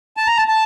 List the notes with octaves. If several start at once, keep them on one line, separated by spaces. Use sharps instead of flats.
A5
A#5
A5
A5